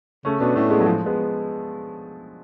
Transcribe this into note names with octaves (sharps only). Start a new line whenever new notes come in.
C#3 A3 C#4
B2 B3 D4
A2 A3 C#4
G#3 B3
F#3
F3 G#3
G#3 B3